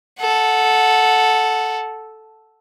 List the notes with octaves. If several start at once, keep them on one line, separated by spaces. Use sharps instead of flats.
A4 F#5